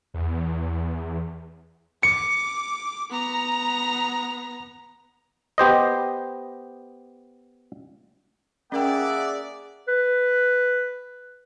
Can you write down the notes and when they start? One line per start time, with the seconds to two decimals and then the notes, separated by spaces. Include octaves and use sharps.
0.14 E2
2.03 D6 C#7
3.09 B3 A#5
5.58 B3 G4 C5 D#5
8.72 A#3 C#4 G#4 A#4 D5 E5 F#5 G5
9.88 B4